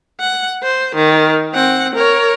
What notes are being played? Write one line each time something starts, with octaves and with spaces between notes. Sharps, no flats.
F#5
C5
D#3
C4 F#5
A#4 C#5